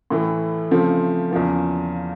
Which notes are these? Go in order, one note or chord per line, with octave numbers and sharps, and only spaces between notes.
A2 E3 A3
C#3 F3 A3 C4
E2 C#3 F3 A#3